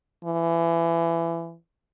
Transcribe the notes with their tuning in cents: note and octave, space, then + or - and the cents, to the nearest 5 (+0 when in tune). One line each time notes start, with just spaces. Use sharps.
E3 +25